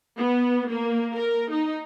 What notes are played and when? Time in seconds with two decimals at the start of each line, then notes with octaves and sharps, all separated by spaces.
0.17 B3
0.69 A#3
1.14 A#4
1.52 D#4